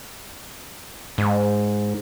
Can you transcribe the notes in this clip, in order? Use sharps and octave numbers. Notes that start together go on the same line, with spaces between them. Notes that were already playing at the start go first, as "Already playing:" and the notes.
G#2